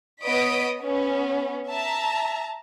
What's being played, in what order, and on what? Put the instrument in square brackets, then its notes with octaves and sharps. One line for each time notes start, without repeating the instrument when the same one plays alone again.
[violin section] B3 C#5 D#5 D#6 B6 D7
B3 C#4
E5 A5 A#5